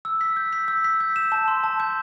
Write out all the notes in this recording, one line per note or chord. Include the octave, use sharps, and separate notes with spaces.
E6
B6
G6
B6
E6
B6
G6
E7
A5
C6
A5
G6